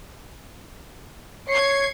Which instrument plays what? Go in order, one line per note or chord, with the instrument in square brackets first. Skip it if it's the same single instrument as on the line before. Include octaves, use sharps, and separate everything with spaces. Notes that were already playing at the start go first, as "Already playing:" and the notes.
[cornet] C#5 [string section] G#6 C7 C#7